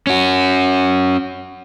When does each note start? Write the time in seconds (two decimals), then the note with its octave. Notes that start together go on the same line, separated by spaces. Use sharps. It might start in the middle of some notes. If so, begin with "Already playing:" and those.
0.07 C#4 F#4